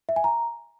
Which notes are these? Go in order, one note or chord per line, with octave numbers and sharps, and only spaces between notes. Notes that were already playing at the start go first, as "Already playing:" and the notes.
E5
G#5
A#5